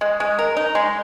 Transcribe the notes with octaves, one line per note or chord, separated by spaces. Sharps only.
G#3
G#3
A#4
D#4
G#3